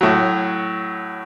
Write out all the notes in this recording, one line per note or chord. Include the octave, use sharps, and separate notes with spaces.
A2 F#3